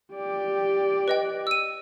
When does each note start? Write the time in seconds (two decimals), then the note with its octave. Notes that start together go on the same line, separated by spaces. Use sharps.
0.14 G4 D5
1.08 B4 D#5 G5
1.47 E6 D#7